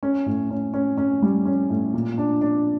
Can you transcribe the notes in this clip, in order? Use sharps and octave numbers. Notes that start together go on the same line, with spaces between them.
C#4
A2
C#4
C#4
C#4
G3
C#4
A2
A#2
D4
D4